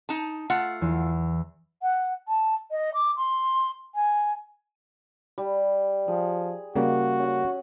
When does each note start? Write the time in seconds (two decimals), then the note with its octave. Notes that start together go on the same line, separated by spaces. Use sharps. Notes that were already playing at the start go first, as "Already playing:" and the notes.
0.09 D#4 A5
0.50 A3 F4 F#5
0.81 E2
1.82 F#5
2.28 A5
2.71 D#5
2.94 D6
3.17 C6
3.95 G#5
5.38 G3
6.08 F3 G#4
6.76 C#3 G3 A#3 F#4
7.19 C#4 F#5